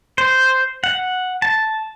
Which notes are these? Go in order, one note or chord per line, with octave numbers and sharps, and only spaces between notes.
C5
F#5
A5